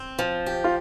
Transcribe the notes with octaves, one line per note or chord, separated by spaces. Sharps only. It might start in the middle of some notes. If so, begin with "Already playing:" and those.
Already playing: C4
F3
G4
F4